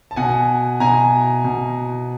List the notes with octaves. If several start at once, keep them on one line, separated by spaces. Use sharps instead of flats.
A5
B2 F#5 G#5
B2 G#5 A#5
B2